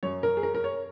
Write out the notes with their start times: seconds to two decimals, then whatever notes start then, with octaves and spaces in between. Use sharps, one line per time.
0.03 F#2 F#3 C#5
0.23 A#4
0.37 G#4
0.43 A#4
0.55 A#4
0.64 C#5